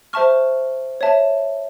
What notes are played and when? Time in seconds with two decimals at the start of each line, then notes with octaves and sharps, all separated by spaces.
0.13 C5 E5 A5 C#6 F6
1.01 C#5 E5 A5